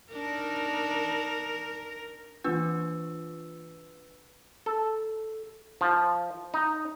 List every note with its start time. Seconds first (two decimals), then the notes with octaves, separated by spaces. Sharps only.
0.12 D4 D#4 A#4
2.44 E3 A#3 D4 F4 B4 E6
4.66 A4
5.81 F3
6.54 D#4